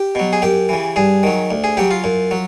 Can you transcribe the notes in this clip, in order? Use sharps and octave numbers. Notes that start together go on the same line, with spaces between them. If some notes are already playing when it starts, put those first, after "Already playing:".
Already playing: G4
B2 F#3
G#4
F#2 G4
C#3 E3
G2 G#4
D#3 F#3
D2
G#4
C#3 F#3 G4
F4
F#2
F#3